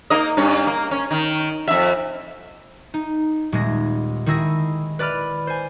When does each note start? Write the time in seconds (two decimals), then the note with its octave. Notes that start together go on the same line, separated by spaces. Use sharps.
0.10 A#3 D#4 D#5
0.37 G2 C#4
0.67 A#3
0.91 C#4
1.11 D#3
1.68 F2 E5
2.94 D#4
3.52 D#1 G#3 A#6
4.26 D#3 E4 G#4 E6 A#6
4.99 B4 D5 B5 F6
5.47 C5 G#5